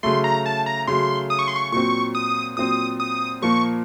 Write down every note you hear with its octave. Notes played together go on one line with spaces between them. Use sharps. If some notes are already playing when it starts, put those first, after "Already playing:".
C#3 F#3 A3 C6
A#5
A5
A#5
C#3 F#3 A3 C6
D#6
C#6
C6
C#6
A#2 F#3 C4 C#6
D#6
A#2 F#3 C4 D#6
D#6
A#2 F3 A#3 C#6